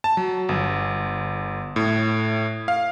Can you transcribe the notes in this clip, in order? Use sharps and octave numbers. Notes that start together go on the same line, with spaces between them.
A5
F#3
G1
A2
F5